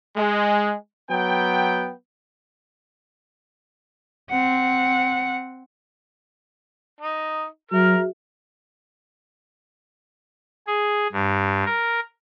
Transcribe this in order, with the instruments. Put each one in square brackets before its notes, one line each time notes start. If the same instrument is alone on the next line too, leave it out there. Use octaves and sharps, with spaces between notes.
[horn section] G#3
F#3 B3 G5
[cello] C4 F#5
[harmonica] D#4
[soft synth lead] F#3 [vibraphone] F#4 G#4 E5 [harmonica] A#4 F6
[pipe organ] G#4
G2
A#4